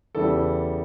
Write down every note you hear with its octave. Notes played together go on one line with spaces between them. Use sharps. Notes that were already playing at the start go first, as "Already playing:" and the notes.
E2 C#3 E3 G3 A4